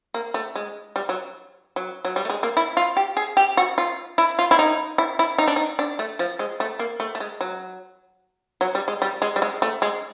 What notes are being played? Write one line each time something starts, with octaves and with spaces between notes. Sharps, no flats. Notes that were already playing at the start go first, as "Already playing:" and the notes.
A#3
A3
G#3
G3
F#3
F#3
F#3
G3
A3
G#3
A#3
E4
F4
G4
G#4
G4
F#4
F4
E4
F4
E4
D#4
E4
E4
D#4
D4
D#4
D4
A3
F3
G#3
A3
A#3
A3
A3
G#3
F#3
F#3
G3
G#3
G3
G#3
G3
G#3
A3
G#3